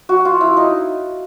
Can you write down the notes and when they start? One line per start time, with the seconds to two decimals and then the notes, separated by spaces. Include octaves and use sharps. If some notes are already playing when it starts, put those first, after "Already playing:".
0.09 F#4
0.25 F4
0.41 E4
0.57 D#4